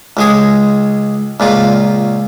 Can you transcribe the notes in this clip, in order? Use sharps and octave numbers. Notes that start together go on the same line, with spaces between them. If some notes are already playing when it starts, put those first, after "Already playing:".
C#2 G#3 G#4
C#2 A#2 F4